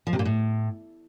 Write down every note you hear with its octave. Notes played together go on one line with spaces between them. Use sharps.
F3
C3
A#2
A2